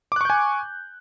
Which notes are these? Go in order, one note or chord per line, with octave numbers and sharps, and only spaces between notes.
G#5 C#6 D6 F#6 G6